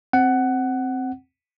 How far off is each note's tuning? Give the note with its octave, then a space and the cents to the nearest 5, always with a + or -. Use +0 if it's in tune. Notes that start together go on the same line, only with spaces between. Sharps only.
C4 +0 F#5 +15